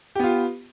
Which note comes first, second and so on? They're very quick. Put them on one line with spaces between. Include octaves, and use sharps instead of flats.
G4 B3 F4